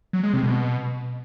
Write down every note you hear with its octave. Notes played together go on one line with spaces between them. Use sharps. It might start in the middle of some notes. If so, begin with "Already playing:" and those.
F#3
G#3
C3
B2